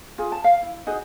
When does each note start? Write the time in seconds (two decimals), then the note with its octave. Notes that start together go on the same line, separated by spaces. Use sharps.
0.18 F4 G#4
0.32 A5
0.44 F5
0.62 E4
0.87 D#4 F#4 G#4 D#5